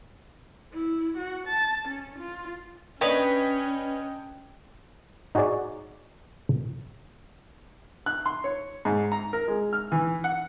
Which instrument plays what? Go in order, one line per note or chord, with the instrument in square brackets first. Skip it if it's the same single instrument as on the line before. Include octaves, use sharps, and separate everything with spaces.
[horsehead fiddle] E4
F#4
A5
C#4
F4
[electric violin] C#4 [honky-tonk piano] D4 D#5 [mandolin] B4 C#5 [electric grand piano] G5
[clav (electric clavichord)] D#4 F#4 G#4 C#5 D5
[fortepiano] F#6
C6
C#5
G#2
A#5
A#4
G#3
F6
E3
F#5